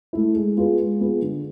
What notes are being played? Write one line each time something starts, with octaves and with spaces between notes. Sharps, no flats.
A3 E4
G#3
B3 F4 G#4 B4
G#3
B3 F4 G#4 B4
D3